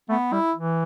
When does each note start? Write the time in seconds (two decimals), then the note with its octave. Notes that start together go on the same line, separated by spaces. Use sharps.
0.09 A3 B3
0.32 G3 E4
0.55 E3